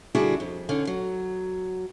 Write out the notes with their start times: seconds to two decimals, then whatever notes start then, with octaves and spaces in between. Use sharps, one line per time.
0.15 D3 G3 D4 E4 F#4 G#4
0.40 F2
0.69 D3 C#4 D#4
0.87 F#3